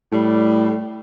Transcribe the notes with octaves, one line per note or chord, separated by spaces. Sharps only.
A2 G3